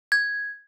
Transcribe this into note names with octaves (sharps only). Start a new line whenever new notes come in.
G#6